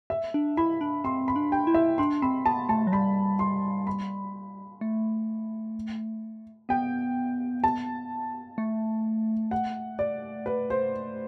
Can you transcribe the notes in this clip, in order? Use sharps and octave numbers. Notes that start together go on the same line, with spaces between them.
E5
D4
E4 B5
D4
C4 C6
B5
D4
G5
E4
E5
D4 C6
C4 B5
B3 A5
A3 A5
F#3
G3 B5
C6
B5
A3
B3 G5
A5
A3
F#5
D5
B4
C5